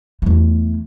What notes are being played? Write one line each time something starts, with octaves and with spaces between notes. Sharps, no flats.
E2 A3